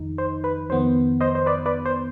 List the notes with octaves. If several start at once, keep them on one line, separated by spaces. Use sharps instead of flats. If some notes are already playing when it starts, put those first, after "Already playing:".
Already playing: F2 D#3 D#4
C5
B4
F2 D#3 B3 C5
C5 D#5
C5
B4 D5
B4 D5
C5